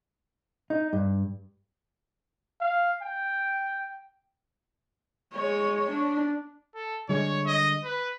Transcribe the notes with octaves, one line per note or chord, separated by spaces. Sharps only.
D#4
G2
F5
G5
G#3 C#5
D4
A4
D3 G3 G#3 C#5
D#5
B4